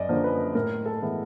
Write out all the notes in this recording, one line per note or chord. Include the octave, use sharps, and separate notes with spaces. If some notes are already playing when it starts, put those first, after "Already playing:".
Already playing: F#2 D5 D#5
D3 F3 A#3
B4
A2 A#4
A4
E3 G#3 B3